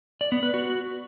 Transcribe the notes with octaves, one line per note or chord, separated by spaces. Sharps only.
D5
B3
B4
F#4